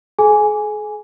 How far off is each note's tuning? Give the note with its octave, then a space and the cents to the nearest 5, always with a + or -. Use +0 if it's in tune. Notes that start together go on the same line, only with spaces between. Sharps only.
G#4 +45 G#5 +0